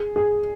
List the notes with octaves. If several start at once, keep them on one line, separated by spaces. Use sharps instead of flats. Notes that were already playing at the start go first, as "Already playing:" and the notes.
Already playing: G#4
G#4